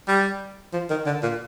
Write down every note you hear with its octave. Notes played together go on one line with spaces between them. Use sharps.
G3
F3
D#3
D3
A#2